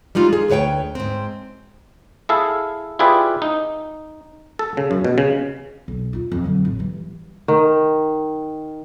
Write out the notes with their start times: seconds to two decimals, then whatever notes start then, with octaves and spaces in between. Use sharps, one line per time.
0.15 G3 G#3 D#4 F4
0.33 G#4
0.50 D2 B4 C#5 F#5 G5
0.95 G#2 C4
2.29 E4 G#4 A4 F5
2.99 E4 F4 G4 G#4 B4 D5
3.42 D#4
4.59 A4
4.77 C#3
4.91 F#2
5.04 B2
5.18 C#3
5.88 B1
6.13 D#4 F4
6.32 F2
6.44 D3 F#3
6.65 A1
6.79 E3 G3
7.48 D#3